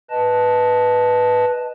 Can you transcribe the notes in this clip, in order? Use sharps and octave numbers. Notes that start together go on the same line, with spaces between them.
B4 D#5 A5